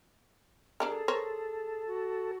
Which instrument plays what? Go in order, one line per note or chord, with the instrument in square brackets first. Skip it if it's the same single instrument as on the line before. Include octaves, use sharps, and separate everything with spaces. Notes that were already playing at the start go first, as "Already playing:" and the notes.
[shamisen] G3 D4 A#4 [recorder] G#4
[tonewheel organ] A4
[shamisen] A#4 C5 C#5
[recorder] F#4